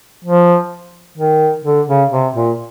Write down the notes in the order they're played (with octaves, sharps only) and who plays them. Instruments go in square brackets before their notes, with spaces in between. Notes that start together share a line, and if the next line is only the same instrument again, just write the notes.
[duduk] F3
D#3
D3
C#3
C3
A#2